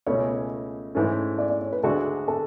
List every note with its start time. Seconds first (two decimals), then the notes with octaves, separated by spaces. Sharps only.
0.07 C#2 B2 A3 C#4 C#5
0.95 G#2 E3 A3 C#4
1.38 D5
1.50 D5
1.62 C#5
1.73 B4
1.83 D2 D3 G#3 D4 F#4 A4
2.28 A4